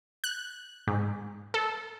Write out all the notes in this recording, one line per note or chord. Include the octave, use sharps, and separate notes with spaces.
F#6
G#2
A4